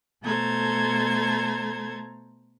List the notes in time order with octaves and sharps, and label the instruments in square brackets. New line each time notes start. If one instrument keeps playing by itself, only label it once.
[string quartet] B2 A3 A4 C5 A#5 G#6